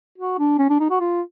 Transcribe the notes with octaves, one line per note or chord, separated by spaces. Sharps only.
F#4
D4
C#4
D4
D#4
F#4
F4